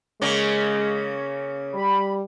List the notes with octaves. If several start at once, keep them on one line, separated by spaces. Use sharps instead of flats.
C#3 G#3 A#3 C#4
G3 B5